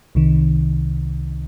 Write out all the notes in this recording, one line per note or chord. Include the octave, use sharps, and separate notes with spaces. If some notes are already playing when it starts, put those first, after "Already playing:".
C2 C3 D#3